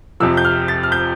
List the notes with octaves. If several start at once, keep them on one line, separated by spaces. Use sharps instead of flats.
F2 C3 F3 E6
G6
F6
A6
F6
G6